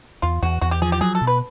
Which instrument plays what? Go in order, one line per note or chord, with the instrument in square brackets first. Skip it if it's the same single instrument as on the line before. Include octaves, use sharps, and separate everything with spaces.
[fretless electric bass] E2 [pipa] F4
[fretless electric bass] E2 [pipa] F#4
[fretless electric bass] E2 [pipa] F#4
[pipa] G4
[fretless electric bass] F3 [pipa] G#4
[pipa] G4
[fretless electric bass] F#3 [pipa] G#4
[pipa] A4
[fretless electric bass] B2
[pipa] B4